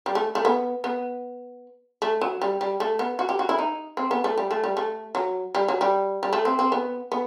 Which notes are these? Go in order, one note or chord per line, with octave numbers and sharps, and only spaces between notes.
G3
A3
A3
B3
B3
A3
F#3
G3
G3
A3
B3
F#4
G4
F#4
E4
D#4
C4
B3
A3
G3
A3
G3
A3
F#3
G3
F#3
G3
G3
A3
C4
C4
B3
B3